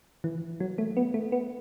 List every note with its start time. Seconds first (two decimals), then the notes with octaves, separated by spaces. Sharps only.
0.24 E3
0.60 F#3
0.78 A3
0.97 B3
1.14 A3
1.32 B3